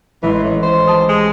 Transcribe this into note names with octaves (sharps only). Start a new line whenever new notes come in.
A1 E3 G#3 C6
A2
C5
G4 A5 D#6
G#3